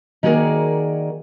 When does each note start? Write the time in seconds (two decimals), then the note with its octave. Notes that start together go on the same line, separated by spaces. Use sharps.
0.23 D#3 A#3 F#4 G#4 A#4 D5